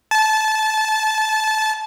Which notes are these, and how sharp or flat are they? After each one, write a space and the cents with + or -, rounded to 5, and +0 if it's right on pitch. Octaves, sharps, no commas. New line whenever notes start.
A5 -20